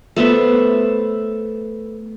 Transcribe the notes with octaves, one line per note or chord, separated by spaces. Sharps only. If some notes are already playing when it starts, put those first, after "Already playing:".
A3 B3 C5 E5